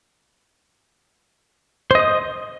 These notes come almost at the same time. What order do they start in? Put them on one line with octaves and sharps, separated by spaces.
C5 D#5 D#6